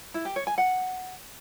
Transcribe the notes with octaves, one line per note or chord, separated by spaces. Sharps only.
E4
G4
C#5
G#5
F#5